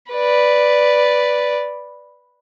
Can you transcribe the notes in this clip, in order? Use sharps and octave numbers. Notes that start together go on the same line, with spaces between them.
B4 D5